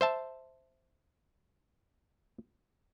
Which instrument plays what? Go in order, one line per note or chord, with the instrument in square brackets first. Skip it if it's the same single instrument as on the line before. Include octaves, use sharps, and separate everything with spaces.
[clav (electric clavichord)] C5 E5 A5